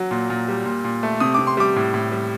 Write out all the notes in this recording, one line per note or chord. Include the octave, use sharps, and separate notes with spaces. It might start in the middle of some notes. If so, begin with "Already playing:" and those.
Already playing: F#3
A#2
A#2
G3
A#2
A#2
A3
C3 D#6
C3 D6
C6
G3 D6
A2
A2
G3